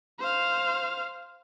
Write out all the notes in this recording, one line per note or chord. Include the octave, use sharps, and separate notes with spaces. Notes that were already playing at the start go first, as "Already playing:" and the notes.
C5 F5